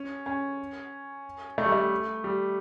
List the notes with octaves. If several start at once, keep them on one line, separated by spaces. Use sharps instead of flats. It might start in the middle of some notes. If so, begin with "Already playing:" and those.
Already playing: C#4
C#4
A3
G3
A3
G3